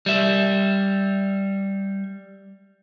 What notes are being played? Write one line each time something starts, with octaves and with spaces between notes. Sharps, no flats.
G3 E5